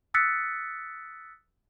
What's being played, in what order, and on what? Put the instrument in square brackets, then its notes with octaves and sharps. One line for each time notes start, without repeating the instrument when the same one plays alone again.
[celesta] D#6 E6 F#6 A6 B6 C#7